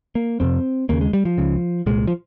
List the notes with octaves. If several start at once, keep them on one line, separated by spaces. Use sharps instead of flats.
A#3
F2 C3 C4
D#2 C#3 A#3
G#3
G3
F3
C#2 C#3
C2 A#2 G#3
F3